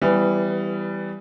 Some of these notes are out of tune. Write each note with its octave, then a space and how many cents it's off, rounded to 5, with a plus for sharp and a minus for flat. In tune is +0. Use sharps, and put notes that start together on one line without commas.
E3 +0 G3 +0 B3 +25